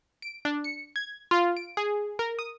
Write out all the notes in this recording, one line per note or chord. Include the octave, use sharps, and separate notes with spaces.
D7
D4
C#7
G#6
F4
D7
G#4
A#4
D#6